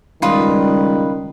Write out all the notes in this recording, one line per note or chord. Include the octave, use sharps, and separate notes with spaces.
C#2 D#3 G3 F4 B4 D#6